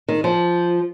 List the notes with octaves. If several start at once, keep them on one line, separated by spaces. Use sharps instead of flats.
D#3
F3